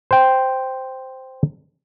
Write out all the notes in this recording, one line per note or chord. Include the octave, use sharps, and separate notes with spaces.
C5 G5